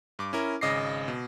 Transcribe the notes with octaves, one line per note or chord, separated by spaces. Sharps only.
G2 D6
C#4 E4 A#4
G#1 C#3 D#5 D6 A#6 C7
B2